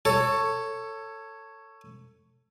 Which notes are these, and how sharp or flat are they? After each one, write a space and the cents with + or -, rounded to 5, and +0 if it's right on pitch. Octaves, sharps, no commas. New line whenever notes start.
A4 +20 C#5 +0